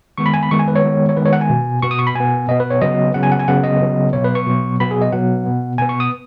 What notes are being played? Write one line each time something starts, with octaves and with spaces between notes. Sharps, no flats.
D#3 G#3 B3 C#6
B5
G#5
B5
D#3 G#3 B3 C#6
G#5
B4
C#5
D#3 G#3 B3
C#5
D#3 G#3 B3 B4
C#5
F#5
G#5
B2 B3
B2 B3 C#6
D#6
C#6
B5
B2 B3 G#5
B2 B3 D#5
B4
C#5
C#3 F#3 B3 D#5
C#3 F#3 B3 F#5
G#5
F#5
G#5
C#3 F#3 B3 F#5
D#5
C#3 F#3 B3
B2 F#3 B3 C#5
B4
C#6
B2 F#3 B3
B2 F#3 B3 B5
G#4
D#5
B2 F#3 B3 F#5
B2 B3
B2 B3 G#5
C#6
D#6